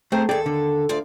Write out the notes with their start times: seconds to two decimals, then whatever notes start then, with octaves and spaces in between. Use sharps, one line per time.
0.12 A3 C4 G#4 C5 A#5
0.29 D#2 G#4 A4 D5 G5
0.46 D3
0.89 D2 F4 D5